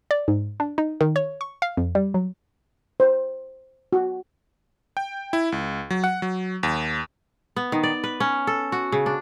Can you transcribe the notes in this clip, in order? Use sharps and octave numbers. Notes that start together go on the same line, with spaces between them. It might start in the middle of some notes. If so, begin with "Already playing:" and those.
D5
G#2
D4
D#4
D#3
C#5
C#6
F5
F2
G3
F#3
C5
F#4
G5
E4
C#2
F#3
F#5
F#3
D#2
B3
D#3
D5
B4
C#4
A4
F#4
C#3
D4